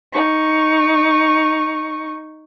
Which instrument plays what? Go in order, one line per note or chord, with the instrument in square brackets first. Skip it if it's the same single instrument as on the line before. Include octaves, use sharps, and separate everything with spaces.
[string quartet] D#4 C#6